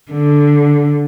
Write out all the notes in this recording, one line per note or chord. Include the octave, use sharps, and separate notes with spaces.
D3